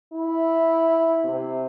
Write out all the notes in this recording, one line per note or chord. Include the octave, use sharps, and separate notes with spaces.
E4
C3